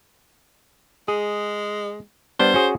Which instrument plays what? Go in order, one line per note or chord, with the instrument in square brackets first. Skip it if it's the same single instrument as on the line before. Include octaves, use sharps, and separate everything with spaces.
[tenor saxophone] G#3 [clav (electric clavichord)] G#4
[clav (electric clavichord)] G3 B3 D4 [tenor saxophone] C5
[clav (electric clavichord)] C#4 F#4 G#4